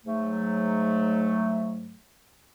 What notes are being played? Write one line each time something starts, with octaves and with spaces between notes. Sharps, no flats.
G#2 F#3 A3